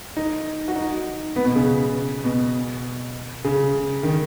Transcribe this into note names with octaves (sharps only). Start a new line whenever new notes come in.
D#4
F#4
D#4
B3
B2
C#3
B2
C#3
D#3